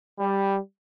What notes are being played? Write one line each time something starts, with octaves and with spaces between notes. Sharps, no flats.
G3